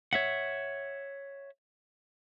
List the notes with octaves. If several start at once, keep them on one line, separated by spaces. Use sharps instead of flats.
C#5 E5 F#5